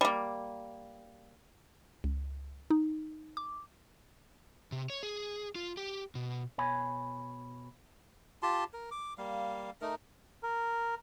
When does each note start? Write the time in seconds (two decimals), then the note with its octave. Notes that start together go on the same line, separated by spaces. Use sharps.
0.01 G3 A#3
2.04 C#2
2.70 D#4
3.37 D6
4.72 C3
4.90 C#5
5.03 G#4
5.55 F4
5.77 G4
6.15 B2
6.58 B2 C#5 G#5 B5
8.43 F4 G4 A5 C6
8.73 A#4
8.91 D6
9.18 G3 A#3 F5
9.81 A3 D#4 A#4
10.43 A#4